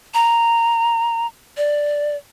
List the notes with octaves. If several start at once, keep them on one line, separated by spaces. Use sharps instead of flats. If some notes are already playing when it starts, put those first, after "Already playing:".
A#5
D5